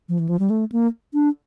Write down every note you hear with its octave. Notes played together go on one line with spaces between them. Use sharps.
F3
E3
F3
G3
A3
A#3
D4